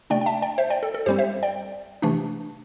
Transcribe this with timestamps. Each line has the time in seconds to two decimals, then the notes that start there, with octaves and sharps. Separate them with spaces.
0.10 C3 A3 D4 D5 G5
0.21 G5
0.26 E5 A5
0.42 D5 G5
0.58 C5 E5
0.70 D5 G5
0.83 A4
0.94 A4
1.06 G2 G3 C4 G4 C5
1.18 C5 E5
1.43 D5 G5
2.02 C3 E3 A3 D4